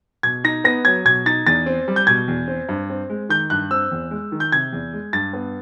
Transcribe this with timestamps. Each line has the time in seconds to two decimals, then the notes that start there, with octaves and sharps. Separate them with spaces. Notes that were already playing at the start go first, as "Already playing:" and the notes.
0.23 B2 G#6
0.44 D#4 A#6
0.64 B3 A#6
0.85 F#3 G#6
1.05 B2 G#6
1.26 D#4 A6
1.47 E2 A6
1.66 C4
1.88 G3
1.96 G6
2.07 B2 G#6
2.28 E2
2.48 C4
2.69 G2
2.90 C4
3.10 G#3
3.29 D#3 G6
3.50 G2 F#6
3.71 C4 E6
3.91 E2
4.11 G#3
4.32 D#3
4.40 G6
4.52 C3 G#6
4.73 E2
4.93 G#3
5.13 G2 A6
5.33 B3